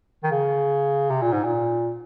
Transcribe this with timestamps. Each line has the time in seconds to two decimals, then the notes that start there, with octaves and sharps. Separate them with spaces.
0.24 D#3
0.31 C#3
1.10 C3
1.22 A#2
1.32 G#2
1.44 A#2